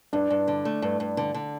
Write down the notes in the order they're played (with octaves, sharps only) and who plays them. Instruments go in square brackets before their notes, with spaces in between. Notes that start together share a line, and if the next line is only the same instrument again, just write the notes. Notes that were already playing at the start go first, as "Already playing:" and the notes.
[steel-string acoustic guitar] G2 [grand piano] D4
[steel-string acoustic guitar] G2
D3
A3
G2
G2
D3
D3